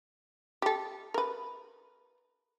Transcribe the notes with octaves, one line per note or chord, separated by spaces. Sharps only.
G4 A4
A#4 B4